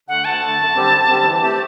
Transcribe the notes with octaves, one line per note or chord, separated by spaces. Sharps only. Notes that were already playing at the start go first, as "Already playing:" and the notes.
D3 A3 F#5
D2 A5
D3 A3
F#2
D3 G3 C4 G4
F#2
D3 G3 C4 G4
E3
A3 C4 G4